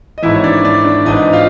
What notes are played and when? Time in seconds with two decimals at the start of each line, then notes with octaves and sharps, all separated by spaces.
0.18 D#5
0.22 G#1 G#2 E3 E4 E5
0.35 C#5
0.44 D4 D5
0.65 D4 D5
0.85 D4 D5
1.06 G#1 G#2 E3 D#4 D#5
1.33 F4 F5